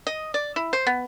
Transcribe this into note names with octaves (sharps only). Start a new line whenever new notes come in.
D#5
D5
E4
C5
B3